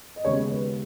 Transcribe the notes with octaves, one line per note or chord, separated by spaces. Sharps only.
D#5
D#2 C#3 G#3 B3 C#5
B4